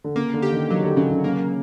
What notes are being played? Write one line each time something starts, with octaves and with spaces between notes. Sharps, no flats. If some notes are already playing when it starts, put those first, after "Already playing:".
D3
C#3 A#3
D3
G4
D#3
D#3 F#3
D3
C#3 F#3
C#3
C#3 A#3